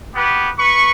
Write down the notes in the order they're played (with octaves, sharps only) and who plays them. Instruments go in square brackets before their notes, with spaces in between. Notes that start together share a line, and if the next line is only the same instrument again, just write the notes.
[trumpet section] B3 G4 B4
B4 C#6